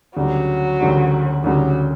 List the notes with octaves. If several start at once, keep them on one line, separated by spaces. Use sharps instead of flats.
D2 C#3 F#3 G3
D2 C#3 G3
D2 C#3 F#3 G3